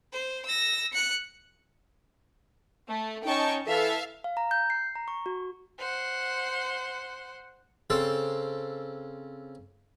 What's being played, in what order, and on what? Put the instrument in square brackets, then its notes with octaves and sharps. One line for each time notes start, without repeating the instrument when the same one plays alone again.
[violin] C5
E6 A#6
F#6 C#7
[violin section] A3
[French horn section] C#4 D#4 [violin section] G5 A5 C#6
[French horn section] E3 A4 [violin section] E5 F5
[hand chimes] F5
A#5
G6
C7
A#5
C#6
F#4
[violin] C5 F#5
[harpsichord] C#3 C4 A4